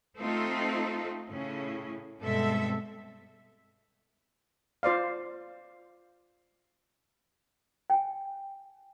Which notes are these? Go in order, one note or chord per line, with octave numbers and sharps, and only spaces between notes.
A3 C4 D#4 F4 A4
A2 C#3 C#4
G2 B2 G#3 C4 A4 E5
F4 C5 D5 F5
G5 G#5